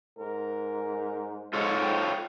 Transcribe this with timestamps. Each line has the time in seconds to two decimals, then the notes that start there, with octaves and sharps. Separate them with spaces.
0.19 G#2 A#4
1.53 G#2 G#3 F4 A4 C#5
1.83 G5